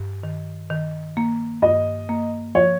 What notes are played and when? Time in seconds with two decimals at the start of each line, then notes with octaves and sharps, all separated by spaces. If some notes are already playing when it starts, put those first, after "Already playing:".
Already playing: G2
0.23 D#3
0.70 D#3
1.17 A#3
1.62 G2 D#5
2.09 A#3
2.55 F3 C#5